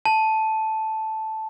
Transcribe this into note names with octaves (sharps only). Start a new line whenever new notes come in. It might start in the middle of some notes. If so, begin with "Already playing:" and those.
A5